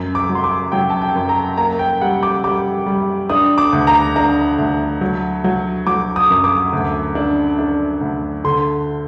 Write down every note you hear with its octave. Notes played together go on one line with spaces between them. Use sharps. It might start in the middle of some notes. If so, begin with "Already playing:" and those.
Already playing: F#2
D6
F#3
C6
D6
F#3 G5
A5
G5
F#2
A#5
A#3 A#5
G5
G3 F#5
D6
G3 D6
G3
D4 D#6
D6
D2
A#5
D4 A#5
D2
F#3
F#3
F#3 D6
D#6
F#2
D6
D2
D4
D4
D2
D3 C6